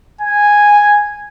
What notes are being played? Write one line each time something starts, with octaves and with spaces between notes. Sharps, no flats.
G#5